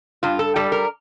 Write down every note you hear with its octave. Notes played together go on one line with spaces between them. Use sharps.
G2 F4
A4
G3 A4
A#4